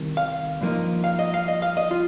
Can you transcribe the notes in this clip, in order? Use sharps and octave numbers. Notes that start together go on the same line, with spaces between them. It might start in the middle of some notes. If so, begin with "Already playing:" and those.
Already playing: C2 C3 D#3
F5
G2 F3 A#3 D#4
F5
D#5
F5
D#5
F5
D#5
F4